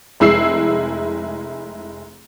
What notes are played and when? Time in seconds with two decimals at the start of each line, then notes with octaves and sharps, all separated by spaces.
0.20 F1 G#3 E4 E6 C7